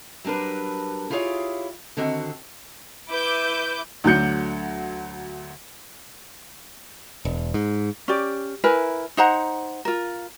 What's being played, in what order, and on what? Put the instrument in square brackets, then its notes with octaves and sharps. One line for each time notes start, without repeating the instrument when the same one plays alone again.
[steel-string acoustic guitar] F#3 G3 D4 A#4 B4
E4 F4 G4 G#4 C#5 F5
D3 D#3 C4 F#4
[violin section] E4 B4 D6 G6
[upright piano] D2 D3 F#3 F#5 G6 C#7
[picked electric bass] E1
G#2
[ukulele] C#4 G4 D5
E4 A#4 B4 G#5
D#4 C5 F#5 A#5
F4 A#4